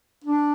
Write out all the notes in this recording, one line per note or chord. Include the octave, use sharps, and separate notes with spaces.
D4